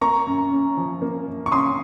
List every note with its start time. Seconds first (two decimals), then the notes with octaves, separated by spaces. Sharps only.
0.01 A#3 A#5 C#6
0.27 F#2
0.52 C#4
0.77 F3
1.02 A#3
1.27 F#2
1.46 C#6
1.52 C#4 C6 D#6